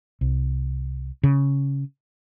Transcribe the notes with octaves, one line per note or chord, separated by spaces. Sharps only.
C2
C#3